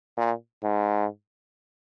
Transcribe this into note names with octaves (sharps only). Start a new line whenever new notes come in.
A#2
G#2